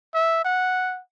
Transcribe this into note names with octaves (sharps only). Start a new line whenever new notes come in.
E5
F#5